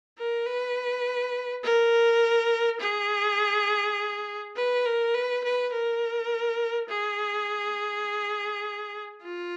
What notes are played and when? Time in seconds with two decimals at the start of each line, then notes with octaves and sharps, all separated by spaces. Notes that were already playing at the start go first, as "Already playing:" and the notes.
0.18 A#4
0.46 B4
1.64 A#4
2.80 G#4
4.56 B4
4.85 A#4
5.14 B4
5.43 B4
5.73 A#4
6.89 G#4
9.23 F4